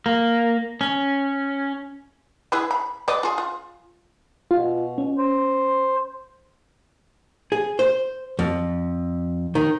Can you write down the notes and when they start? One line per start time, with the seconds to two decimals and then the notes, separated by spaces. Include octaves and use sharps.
0.06 A#3
0.81 C#4
2.52 E4 G#4 B4
2.71 B5
3.08 B4 D5 D#5
3.23 F4 G#4
3.38 F4
4.51 B2 F4
4.98 C#4
5.18 C5
7.52 G#4
7.79 C5
8.39 F2
9.55 D#3